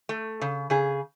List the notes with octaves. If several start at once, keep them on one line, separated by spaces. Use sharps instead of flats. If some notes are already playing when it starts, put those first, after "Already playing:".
A3
C#3
C#3 G#4